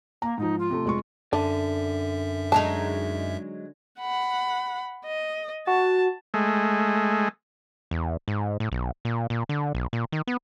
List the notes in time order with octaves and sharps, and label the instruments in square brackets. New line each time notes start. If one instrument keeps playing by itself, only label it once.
[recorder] A#3 [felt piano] A#5
[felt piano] G#2 F3 [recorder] D#4
[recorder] F4
[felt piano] C3 A3
F1 G#3 C#6
[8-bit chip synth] F#2 E5 [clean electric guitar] D3 [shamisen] D4
[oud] F#3 G#3 D#4 [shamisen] A5
[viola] F#5 B5
D#5
[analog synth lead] F#4 [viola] A5
[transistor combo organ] G#3 A3
[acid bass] E2
G#2
A2
B1
A#2
A#2
D3
B1
A#2
D#3
B3